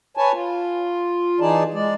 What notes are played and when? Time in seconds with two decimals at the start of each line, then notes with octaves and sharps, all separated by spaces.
0.17 B4 C#5 G#5 A5
0.32 F4
1.40 E3 D#4 G#4 D5 A5
1.74 G#3 D5